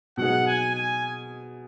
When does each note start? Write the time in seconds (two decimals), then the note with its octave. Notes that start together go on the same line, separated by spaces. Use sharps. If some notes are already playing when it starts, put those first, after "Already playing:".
0.17 B2 F#3 D#4 G#4 F#5
0.47 G#5
0.75 G#5